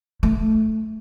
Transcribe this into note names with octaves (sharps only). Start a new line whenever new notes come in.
A3